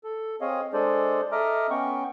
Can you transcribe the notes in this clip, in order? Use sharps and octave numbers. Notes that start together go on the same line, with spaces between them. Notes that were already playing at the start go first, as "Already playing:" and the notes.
A4
C4 G#4 C#5 D#5 F5
G#3 D4 G#4 A4 C5 D5
A4 D#5 E5 A#5 D6 F6
B3 C#4 G5 C#6